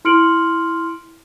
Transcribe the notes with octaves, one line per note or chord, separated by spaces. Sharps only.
E4 C6 F6 C#7 D7 F#7